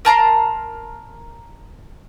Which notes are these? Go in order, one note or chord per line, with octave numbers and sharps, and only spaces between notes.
A#4 A5 A#5 C6